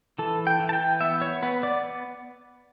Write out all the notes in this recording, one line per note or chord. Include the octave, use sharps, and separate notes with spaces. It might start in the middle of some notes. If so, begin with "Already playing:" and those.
E3 A4
G5
E3
A5
G5
B3 E5
C#5
B3 B4
D5